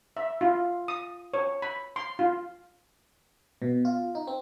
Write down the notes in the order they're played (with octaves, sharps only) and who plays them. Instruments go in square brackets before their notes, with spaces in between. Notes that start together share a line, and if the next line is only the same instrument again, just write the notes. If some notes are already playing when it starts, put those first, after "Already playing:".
[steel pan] E5
F4
D#6
C#5
B5
C6
F4
[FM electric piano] B2
F4
D#4
C4